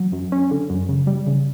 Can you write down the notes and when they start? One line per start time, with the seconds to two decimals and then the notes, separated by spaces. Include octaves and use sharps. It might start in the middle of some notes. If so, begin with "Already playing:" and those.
Already playing: F#3
0.12 F#2
0.32 C#4
0.51 D3
0.70 F#2
0.89 C#3
1.07 G3
1.27 C#3